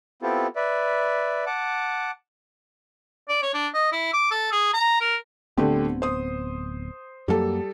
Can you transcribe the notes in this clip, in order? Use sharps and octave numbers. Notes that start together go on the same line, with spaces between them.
B3 C4 E4 F4 G4 A4
B4 D5 E5
F#5 A5 D6
D5
C#5
D4
D#5
E4
D6
A4
G#4
A#5
A#4
D1 D3 A3 B3 C4 G4
C5 D#6
F#2 F#3 G3 A#3 A4